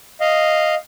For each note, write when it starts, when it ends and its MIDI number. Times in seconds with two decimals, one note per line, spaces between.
0.21 0.75 75
0.21 0.75 77